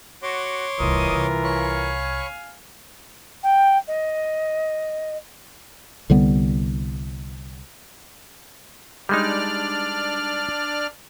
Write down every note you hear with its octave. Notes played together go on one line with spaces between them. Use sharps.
F#4 C#5 C6 D6
D1 C2 E3 F4 A#4 D#5 D#6
C2
C#5 F5 G#5 B5 C#6
G5
D#5
C2 D3 G3 B3
G3 G#3 D4 D#4 D5 F6